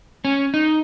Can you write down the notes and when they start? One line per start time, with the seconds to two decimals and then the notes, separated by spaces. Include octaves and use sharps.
0.25 C#4
0.54 D#4